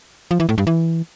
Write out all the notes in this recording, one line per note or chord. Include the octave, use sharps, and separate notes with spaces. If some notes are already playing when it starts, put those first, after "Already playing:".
F3
E3
A2
G2
E3